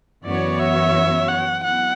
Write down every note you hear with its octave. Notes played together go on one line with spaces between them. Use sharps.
F#2 E3 B3 F#4 C#5 D5
E5
F#5
F#3 B3 E4 F#5